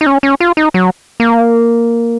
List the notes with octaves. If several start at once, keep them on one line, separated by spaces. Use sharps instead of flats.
D#4
C#4
C#4
F4
D#4
F#3
A#3